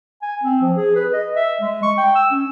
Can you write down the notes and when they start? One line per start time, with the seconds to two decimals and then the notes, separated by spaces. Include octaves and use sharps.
0.22 G#5
0.44 C4
0.62 F3
0.76 G#4
0.95 B4
1.13 D#5
1.36 E5
1.61 G#3
1.83 C#6
1.98 G5
2.15 E6
2.31 C#4